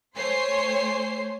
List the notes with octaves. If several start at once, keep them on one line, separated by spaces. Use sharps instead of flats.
A3 C5 C#5 G#5 C6 C7